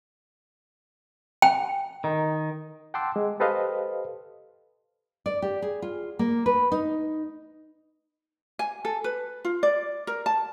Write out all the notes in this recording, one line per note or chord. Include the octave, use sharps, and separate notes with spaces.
G5
D#3
F#5 G5 A5 C6 D6 E6
G#3
G4 A4 B4 C5 D#5 F5
D5
G4
G#4
F4
A#3
B4
D#4
G#5
A4
B4
F4
D5
A#4
A5